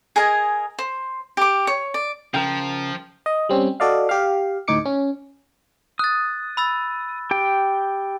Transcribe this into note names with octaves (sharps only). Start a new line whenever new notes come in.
G#4 A#4 D#5 G#5
C5
G4 D6
C#5
D5
C#3 F3 A#4 G5
D#5
G3 C4 C#4
F#4 A4 D5 D#5 F5
G4 F5
D2 A2 D#4 D6 C#7
C#4
D#6 F#6 A6
B5 E6 A6
G4 G5